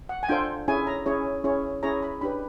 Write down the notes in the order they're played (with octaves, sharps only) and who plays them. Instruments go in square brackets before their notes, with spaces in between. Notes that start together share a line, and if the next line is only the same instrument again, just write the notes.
[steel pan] F#5
G#5
D4 F4 A4 C5 G5
C#4 E4 G#4 C#5 G#5
A#5
C#4 E4 G#4 C#5
C#4 E4 G#4 C#5
C#4 E4 G#4 C#5 A#5
B5
D4 G4 B4 B5